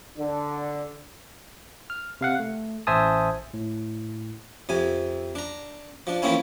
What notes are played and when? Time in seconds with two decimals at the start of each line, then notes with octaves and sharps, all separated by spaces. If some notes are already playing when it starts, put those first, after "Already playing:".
0.18 D3 D4
1.90 F6
2.21 C3 F5 F#5
2.39 A3
2.87 A1 C5 E5 G#5 A5 D#6
3.54 A2
4.69 F2 C3 G#5
5.35 D4 A#5
6.07 F3 D4
6.22 E3 F3 A#3 C4 C#4 E4